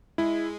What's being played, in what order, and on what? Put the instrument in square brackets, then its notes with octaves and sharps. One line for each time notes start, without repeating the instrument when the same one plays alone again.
[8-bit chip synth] G#3 [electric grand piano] E4